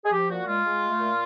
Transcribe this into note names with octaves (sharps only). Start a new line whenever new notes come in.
G#4
F3 G4
A#2 F#4
G#3 F4
G#3
A3
A#2